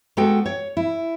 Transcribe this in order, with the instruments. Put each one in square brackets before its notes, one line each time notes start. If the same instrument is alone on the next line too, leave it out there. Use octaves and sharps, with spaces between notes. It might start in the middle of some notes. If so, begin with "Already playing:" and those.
[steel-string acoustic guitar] G#3 B3 F#4 A4 F#5 G5
C#5
E4